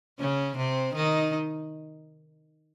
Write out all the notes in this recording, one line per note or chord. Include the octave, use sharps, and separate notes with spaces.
C#3 C#4
C3 C4
D#3 D#4